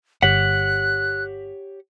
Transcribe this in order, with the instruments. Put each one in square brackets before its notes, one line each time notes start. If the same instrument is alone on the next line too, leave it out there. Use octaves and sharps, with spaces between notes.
[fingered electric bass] G1 [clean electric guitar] G4 C#5 F#5 [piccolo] F#6 [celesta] B6 F#7